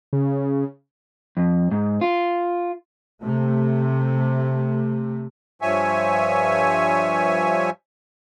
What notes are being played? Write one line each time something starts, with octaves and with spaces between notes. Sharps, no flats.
C#3
F2
G#2
F4
C3 A3
G2 F3 C#5 E5 G#5